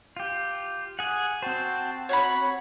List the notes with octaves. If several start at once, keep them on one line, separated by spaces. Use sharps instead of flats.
F4 G4
G#4 F#5
C4 F#4 C5 G5 A5
F#4 C#5 F#5 B5